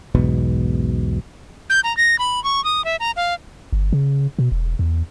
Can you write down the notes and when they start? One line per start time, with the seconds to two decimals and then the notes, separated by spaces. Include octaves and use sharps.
0.15 B1 E2 G#2 B2
1.70 G6
1.84 A#5
1.97 A#6
2.19 B5
2.44 C#6
2.64 D#6
2.85 E5
3.00 A#5
3.16 F5
3.73 G1
3.93 C#3
4.39 B2
4.52 E1
4.79 E2